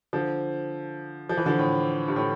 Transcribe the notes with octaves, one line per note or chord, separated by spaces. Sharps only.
D3 F3
F3
E3
D3 F3
A2
G2
A2